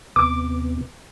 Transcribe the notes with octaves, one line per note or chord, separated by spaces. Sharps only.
D#2 C3 B3 D6